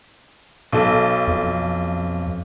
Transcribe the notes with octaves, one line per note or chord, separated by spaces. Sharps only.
B1 A4
F2